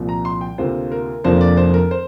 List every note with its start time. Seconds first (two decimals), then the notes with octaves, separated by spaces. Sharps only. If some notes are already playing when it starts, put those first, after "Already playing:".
Already playing: C2 A#2 F3
0.09 A#5
0.25 C6
0.41 G5
0.58 D2 C3 A#3 F4 C5
0.91 A#4
1.24 F1 F2 F3 A#3 D4 C5
1.41 D5
1.57 C5
1.74 A#4
1.91 C5